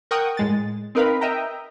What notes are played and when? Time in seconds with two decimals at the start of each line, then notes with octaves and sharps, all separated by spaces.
0.11 A#4 F#5 G5 C#6 D#6
0.37 A2 G#3 A6
0.95 C4 D#4 A#4 B4 F5 B5
1.21 A#4 D#5 E5 G5 A#5